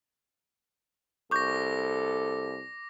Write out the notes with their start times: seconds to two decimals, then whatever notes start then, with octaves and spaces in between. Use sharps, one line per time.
1.31 C2 A4 C#6 D6 G6 A#6